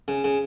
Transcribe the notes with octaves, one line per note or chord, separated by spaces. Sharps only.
C#3
C#3